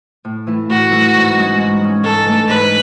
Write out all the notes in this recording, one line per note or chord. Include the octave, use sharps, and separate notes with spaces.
A2
E3 A3 E4
A2 F#4
E3 A3 E4
G#2
G#3 C#4
G#2
G#3 C#4
G#2 A4
E3 A3 D4
G#2 B4